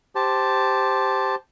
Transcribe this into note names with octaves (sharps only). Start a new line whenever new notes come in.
G4 C5 A5